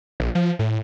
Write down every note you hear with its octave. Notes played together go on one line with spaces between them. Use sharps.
A#1
F3
A2